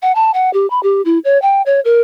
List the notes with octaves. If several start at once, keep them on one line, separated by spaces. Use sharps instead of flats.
F#5
A5
F#5
G4
B5
G4
E4
C#5
G5
C#5
A#4